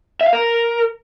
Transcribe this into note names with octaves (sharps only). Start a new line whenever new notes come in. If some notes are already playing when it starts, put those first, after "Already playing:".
E5
F5
A#4